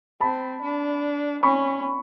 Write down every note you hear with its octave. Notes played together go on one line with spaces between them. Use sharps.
C4 A5 B5
D4
C#4 B5 C#6